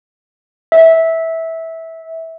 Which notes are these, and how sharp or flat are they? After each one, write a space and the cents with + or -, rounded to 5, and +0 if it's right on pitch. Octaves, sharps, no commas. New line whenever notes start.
E5 -15